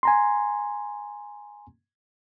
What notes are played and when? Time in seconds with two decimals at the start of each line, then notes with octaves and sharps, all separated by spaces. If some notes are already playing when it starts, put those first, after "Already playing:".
0.03 G#5 A#5 C6